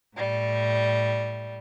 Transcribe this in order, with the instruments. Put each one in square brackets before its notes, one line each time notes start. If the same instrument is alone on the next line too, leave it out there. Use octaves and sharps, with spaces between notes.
[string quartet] A2 G3